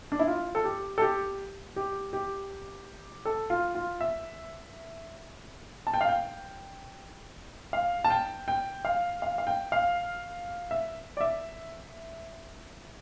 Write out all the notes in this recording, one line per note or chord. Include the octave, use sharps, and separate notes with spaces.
D4
E4
F4
A4
G4
A4
G4
G4
G4
A4
F4
F4
E5
A5
G5
F5
G5
F5
A5
G5
G5
F5
F5
F5
G5
F5
E5
D5
E5